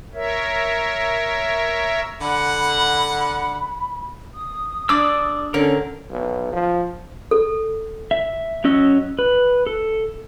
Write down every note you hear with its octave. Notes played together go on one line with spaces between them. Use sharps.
A#4 C#5 E5
D3 F#5 B5
D#6
D4 G#4 D5 D6 E6
D3 C#4 A4 A#4 C#5
B1
F3
A4
E5
F#3 C#4 D#5 E6
B4
A4